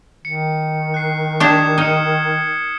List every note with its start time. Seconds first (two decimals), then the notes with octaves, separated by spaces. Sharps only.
0.25 D#3 C#7
0.94 F#6 C7
1.40 D4 G4 D#6 G#6 E7
1.78 D#4 F6 C#7